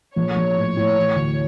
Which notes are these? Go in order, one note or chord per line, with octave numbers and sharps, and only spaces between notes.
A#1 C#5
A#1
A2
A2
E3
D2